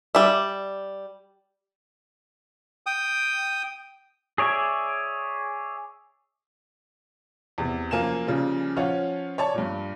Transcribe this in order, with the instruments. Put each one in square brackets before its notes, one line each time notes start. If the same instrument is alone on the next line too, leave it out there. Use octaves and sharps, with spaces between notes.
[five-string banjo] G3 E5
[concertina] G5 D#6
[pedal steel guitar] G#4 C#5 D5 E5 G#5
[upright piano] E2 C3
F#2 F3 A#3 G#5 E7
A#2 C#3 F3 G3
F3 C#4 F4 C#5 F#5
C#5 D5 A5 C#6
G2 A#2